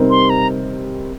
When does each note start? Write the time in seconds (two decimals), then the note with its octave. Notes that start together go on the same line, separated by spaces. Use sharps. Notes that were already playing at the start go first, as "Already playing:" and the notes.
Already playing: C3 G3 C4 D#4 A#4
0.10 C6
0.30 A#5